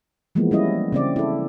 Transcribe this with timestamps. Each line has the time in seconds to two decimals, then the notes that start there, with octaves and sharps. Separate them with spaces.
0.35 E3 F3 G#3 A#3 B3
0.51 G3 C#4 E4 D#5
0.92 C#3 C4 D5
1.16 E4 A4